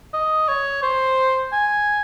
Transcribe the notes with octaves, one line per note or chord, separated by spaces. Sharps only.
D#5
C#5
C5
G#5